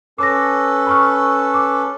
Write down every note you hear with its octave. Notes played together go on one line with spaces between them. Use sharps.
C#4 A4 B4 D6 A#6
B5 C#6 F6
D6